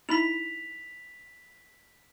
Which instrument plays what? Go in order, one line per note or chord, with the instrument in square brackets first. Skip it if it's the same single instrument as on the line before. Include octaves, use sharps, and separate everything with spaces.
[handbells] D#4 E4 B5 [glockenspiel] B6 F7